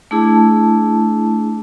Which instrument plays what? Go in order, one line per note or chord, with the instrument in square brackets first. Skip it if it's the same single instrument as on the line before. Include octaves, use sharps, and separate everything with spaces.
[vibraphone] A3 D4 E4 G#4 A5